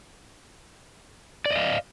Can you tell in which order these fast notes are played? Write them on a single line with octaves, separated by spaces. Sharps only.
D5 D#5 F5